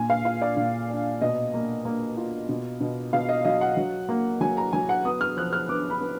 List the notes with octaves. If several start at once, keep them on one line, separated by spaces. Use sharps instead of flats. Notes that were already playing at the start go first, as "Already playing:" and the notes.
Already playing: A#2 G#5
F5
F4 F5
D5
A#2
D4
B2 D#5
A#3
A#3
F4
B2
B2
B2 F5
D#5
F#3 D#5
F#5
F#3
A#3
F#3 G#5
A#5
F#3 G#5
F#5
B3 D#6
F6
F3 F#6
F6
B3 D6
B5
B3